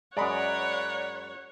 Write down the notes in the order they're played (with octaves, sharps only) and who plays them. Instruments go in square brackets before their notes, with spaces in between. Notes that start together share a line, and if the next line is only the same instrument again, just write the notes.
[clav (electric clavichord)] F#2 G#3 [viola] C#5 F#5 [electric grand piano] D5 A#5 B5